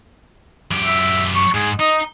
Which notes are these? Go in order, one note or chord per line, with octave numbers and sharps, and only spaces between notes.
F#2 G4
E5
C#6
G#2 G#4
D#4 D#5